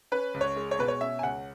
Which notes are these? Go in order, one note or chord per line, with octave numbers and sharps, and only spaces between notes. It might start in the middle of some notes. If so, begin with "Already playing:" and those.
C#4 B4
C#2
C#5
G#3
C#5
B2 B4
C#5
C#4 E5
G#5
C#2 F#5